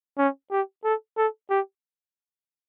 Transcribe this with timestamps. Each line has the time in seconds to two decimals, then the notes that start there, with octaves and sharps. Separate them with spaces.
0.18 C#4
0.51 G4
0.84 A4
1.17 A4
1.50 G4